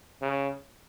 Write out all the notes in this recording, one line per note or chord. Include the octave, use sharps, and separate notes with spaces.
C#3